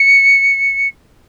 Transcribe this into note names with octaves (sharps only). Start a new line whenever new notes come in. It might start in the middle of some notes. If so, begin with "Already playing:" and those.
Already playing: C#7